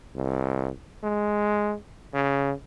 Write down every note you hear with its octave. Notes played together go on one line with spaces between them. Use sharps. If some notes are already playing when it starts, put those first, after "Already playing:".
C2
G#3
C#3